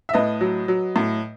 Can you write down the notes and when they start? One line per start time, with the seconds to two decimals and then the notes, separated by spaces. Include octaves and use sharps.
0.09 E5
0.14 A2 B4 D#5
0.41 F#3
0.68 F#3
0.96 A2